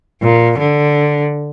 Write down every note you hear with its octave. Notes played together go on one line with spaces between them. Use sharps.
A#2
D3